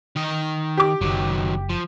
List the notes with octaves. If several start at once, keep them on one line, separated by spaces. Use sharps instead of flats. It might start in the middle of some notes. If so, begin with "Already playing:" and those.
D#3 D#5
G4 D6
F#1 D#3 F#3
F3